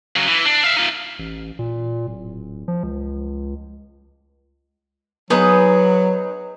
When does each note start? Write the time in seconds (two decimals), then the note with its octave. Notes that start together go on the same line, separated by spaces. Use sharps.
0.16 C#3 F#3
0.28 E3
0.45 D4
0.64 E5 F5
0.76 D#4 F4
1.19 A1
1.59 A#2
2.07 D1
2.68 F3
2.83 C#2
5.30 F#3 B3 D#4 G#4 B4